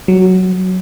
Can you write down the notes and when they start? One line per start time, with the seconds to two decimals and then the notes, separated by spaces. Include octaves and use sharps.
0.08 F#3